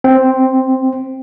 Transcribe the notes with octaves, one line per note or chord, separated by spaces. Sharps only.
C4